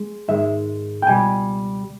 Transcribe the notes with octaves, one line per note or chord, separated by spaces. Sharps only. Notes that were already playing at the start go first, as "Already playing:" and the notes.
Already playing: G#3
G#2 D#3 G#3 E5
G5
C#2 B2 G3 G#5